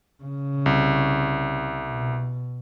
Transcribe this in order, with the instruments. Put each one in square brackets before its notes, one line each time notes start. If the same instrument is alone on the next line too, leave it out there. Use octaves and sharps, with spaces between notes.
[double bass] C#3
[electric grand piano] C2
[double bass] B2